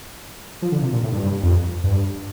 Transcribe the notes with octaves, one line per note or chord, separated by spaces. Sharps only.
F3
D3
C3
A#2
A2
G2
G2
F2
G2